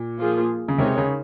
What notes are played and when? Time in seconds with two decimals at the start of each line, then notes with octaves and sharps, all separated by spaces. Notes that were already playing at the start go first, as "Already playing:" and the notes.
Already playing: A#2
0.19 F3 A#3 F4 G#4
0.68 C#3
0.78 C3 G#3 D#4 A#4 C#5
0.97 C#3